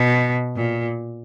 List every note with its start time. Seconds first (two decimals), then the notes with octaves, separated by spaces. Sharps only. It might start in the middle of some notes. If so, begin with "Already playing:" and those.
Already playing: B2
0.55 A#2